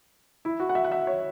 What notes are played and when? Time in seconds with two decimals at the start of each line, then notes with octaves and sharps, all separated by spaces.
0.45 E4
0.60 F#4
0.69 F#5
0.75 E5
0.85 F#5
0.92 E5
1.07 C#5